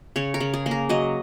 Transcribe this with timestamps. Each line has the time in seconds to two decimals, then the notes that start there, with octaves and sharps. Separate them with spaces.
0.16 C#3 C#5
0.34 A#4
0.40 C#3
0.54 G#4
0.66 A#3
0.71 A#4
0.89 F#3 D#5